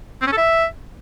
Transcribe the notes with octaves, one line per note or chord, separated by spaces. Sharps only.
C4
C#4
A4
E5